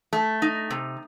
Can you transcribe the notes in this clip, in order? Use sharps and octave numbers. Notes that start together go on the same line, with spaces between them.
A3
D#4
C3